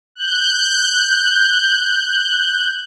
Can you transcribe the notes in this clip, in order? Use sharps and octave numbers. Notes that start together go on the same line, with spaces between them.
F#6 G6